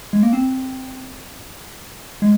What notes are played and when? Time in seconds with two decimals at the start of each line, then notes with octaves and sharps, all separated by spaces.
0.13 G#3
0.23 A#3
0.33 C4
2.22 G#3